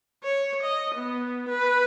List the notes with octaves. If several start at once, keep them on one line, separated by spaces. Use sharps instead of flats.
C#5
D#5
B3
B4